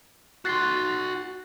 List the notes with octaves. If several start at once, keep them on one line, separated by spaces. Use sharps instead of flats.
F#4 C6 F#6 A6 C7